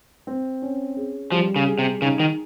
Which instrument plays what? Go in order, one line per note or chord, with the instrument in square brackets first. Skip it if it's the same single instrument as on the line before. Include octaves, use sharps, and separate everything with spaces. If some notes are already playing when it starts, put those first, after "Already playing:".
[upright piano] C4
C#4
G#4
[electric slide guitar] F3 [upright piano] G3
[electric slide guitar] C#3
[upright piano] G#4
[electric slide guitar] C3
[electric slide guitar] C#3 [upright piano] D#4
[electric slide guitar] D#3